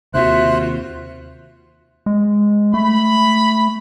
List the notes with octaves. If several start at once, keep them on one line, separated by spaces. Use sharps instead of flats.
D#2 C3 D#3 F4 F#4 C5 E5 F#6
G#3
A3 B5